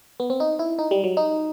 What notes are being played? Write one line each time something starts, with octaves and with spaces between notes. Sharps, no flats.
B3
C4
D#4
E4
D#4
G3
F#3
D#4